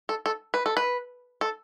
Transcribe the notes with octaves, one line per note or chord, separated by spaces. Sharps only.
A4
A4
B4
A4
B4
A4